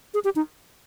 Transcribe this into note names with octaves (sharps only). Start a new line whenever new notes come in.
G#4
G4
D#4